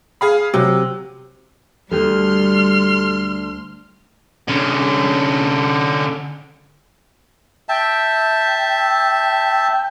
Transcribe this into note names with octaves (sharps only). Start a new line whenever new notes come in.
G#4 F5 B5
C3 F#3
D2 G3 G4 A4 C6 F6
D3 C#4
E5 G5 A5